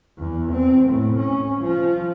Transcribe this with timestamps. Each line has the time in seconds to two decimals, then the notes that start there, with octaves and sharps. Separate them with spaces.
0.19 E2
0.52 C4
0.89 A2
1.19 C#4
1.61 F3